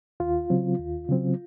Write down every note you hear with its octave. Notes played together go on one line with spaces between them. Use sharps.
D#2 F4
C#3 F#3 C4
D#2
C#3 F#3 C4